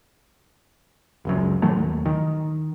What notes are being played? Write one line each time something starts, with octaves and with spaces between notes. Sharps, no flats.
F#1 C#2 F#2
A2 D#3 F#3 A3
D#2
D#3